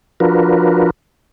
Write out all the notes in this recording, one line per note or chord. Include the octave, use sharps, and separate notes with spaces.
F3 D4 F4 F#4 A#4 B4